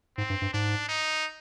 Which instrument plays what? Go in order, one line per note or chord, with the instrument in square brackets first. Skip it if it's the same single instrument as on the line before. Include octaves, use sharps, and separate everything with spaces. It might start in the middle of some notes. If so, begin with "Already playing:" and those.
[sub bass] G#2 [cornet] C4
[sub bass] G2
G2
[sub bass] G#2 [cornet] D4
[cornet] D#4